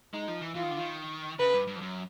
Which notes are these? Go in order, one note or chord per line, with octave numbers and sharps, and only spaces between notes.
G#3 D#4
F3
E3
E3 F4
D#3
D3
D#3
C#3 B4
G2
G2
F2
F#2